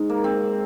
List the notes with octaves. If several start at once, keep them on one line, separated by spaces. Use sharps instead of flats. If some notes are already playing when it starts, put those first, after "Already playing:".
Already playing: G#2
A#3
C4